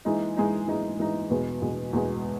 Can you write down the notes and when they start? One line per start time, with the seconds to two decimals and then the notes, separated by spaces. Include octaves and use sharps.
0.05 E3 G#3 D#4
0.37 E3 G#3 D#4
0.68 E3 G#3 D#4
0.99 E3 G#3 D#4
1.30 E2 B2 G#3 B3
1.61 E2 B2 G#3 B3
1.93 E2 B2 G#3 B3